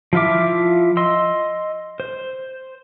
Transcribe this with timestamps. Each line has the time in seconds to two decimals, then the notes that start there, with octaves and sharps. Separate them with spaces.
0.13 F3 E4 F4 E5 D6
0.97 D#5 C6 E6
2.00 C5